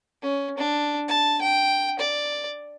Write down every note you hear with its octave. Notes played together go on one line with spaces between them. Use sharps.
C#4
D4
A5
G5
D5